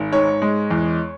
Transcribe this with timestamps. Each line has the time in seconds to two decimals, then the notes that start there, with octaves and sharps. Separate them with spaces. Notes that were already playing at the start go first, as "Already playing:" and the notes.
Already playing: G#1
0.12 G#2 C#5
0.42 G#3
0.71 E2